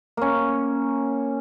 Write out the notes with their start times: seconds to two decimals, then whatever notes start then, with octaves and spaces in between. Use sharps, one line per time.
0.17 A#3 C#4